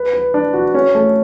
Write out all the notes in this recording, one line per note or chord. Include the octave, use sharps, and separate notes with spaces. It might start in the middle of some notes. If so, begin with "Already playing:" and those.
Already playing: B4
B4
D4
F#4
C#4
A3